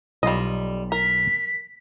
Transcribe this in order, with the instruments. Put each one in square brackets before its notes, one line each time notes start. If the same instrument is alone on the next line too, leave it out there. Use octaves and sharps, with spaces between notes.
[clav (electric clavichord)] B1 F4 [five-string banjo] G3 D#5
[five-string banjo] A#4 [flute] B6